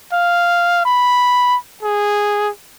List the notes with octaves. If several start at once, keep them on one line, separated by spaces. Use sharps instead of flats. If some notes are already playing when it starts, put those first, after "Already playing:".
F5
B5
G#4